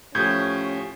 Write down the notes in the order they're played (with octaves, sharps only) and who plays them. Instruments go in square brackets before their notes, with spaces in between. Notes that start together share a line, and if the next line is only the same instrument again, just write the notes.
[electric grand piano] A2 F3 [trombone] C#4 [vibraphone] G4 [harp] G6 G#6